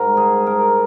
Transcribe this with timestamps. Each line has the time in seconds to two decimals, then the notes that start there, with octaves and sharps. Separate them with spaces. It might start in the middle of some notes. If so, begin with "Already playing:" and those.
Already playing: G#2 G3 A#4
0.17 G#4
0.47 A#4